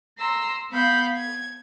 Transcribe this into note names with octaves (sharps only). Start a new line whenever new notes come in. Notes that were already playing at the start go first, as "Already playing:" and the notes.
A#5 C6 E6
B3 F5 B5 G6
G#6